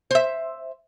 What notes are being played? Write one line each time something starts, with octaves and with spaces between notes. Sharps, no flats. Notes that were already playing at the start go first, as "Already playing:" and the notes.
C5 E5